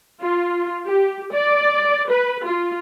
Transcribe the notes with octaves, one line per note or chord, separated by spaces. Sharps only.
F4
G4
D5
B4
F4